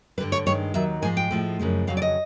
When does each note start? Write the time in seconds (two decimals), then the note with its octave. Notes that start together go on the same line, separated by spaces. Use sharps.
0.18 G2 D3 G3 B4
0.32 C#5
0.46 G2 D#3 G#3 C#5
0.74 D#2 D#3 F#3 E5
1.02 G#2 F3 G#3 G#5
1.17 G5
1.31 A2 F3 G#3
1.59 F#2 C#3 F3 G#3
1.87 F2 C#3 F#3 F5
1.97 D5
2.02 D#5